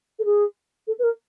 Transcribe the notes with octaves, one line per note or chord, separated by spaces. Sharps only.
A4
G#4
A4
B4
A#4